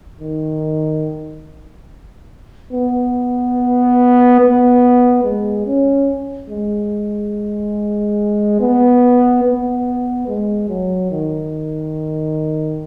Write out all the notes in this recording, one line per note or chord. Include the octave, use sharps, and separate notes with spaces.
D#3
B3
B3
G#3
C#4
G#3
B3
B3
G#3
F#3
D#3